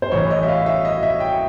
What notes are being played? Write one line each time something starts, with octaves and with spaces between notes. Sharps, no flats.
C5
A1 A2 E3 C#5
D#5
E5
F5
E5
D#5
E5
G5